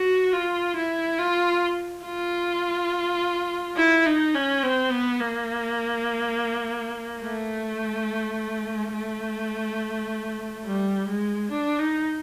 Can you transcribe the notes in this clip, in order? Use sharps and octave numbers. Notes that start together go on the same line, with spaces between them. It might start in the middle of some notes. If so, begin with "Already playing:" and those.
Already playing: F#4
F4
E4
F4
F4
E4
D#4
C#4
C4
B3
A#3
A3
A3
G3
G#3
D4
D#4